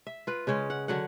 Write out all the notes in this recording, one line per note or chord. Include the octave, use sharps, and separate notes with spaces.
E5
F4 B4
C#3 G#3 C#4 C#5
F#5
D3 F#3 F#5